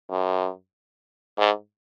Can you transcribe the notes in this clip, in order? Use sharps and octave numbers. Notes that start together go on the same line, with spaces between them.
F#2
G#2